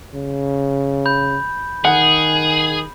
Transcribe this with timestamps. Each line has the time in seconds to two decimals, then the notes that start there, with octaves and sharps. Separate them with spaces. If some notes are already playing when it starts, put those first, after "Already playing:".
0.15 C#3
1.06 B5 G6
1.85 D#3 G#4 F#5